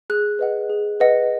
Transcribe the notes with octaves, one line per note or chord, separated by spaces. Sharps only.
G#4 F#6
B4 D#5 F#5
G#4
B4 D#5 F#5